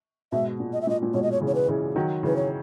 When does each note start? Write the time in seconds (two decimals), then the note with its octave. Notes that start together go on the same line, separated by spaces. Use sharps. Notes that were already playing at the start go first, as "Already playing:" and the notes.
0.32 G#2 B2 E5
0.60 A#2
0.73 D#5
0.82 E5
0.87 A#2 D#5
1.03 A#2
1.14 G#2 B2 C#5
1.23 D#5
1.32 C#5
1.41 C#3 E3
1.47 C#5
1.55 B4
1.68 C#3 E3
1.96 D#3 F#3
2.23 C#3 E3 B4
2.36 C#5